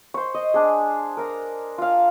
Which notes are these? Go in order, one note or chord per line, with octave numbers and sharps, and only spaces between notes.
C5 C#6
D#5
D4 G#4
A#4 A#5
F4 F5